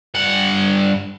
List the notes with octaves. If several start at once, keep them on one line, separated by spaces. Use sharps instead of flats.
G2 F#5